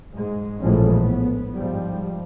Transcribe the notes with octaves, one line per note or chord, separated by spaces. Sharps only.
G#2 G#3
A#1 A2 E3 F3 G#3 C#4
B3
G#2 F3 G3